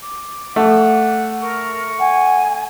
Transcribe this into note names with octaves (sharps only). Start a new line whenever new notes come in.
D6
A3 F#5
A#4 C#6
F#5 G#5